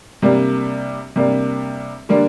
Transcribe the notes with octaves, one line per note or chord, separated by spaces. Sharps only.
C3 G3 A#3 D4
C3 G3 A#3 D4
D3 G3 A#3 D4